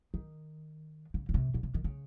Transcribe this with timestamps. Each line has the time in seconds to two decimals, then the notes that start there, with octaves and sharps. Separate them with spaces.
0.14 D#3
1.14 C#3
1.29 C#3
1.34 C3
1.54 A#2
1.63 C3
1.74 D#3
1.84 C#3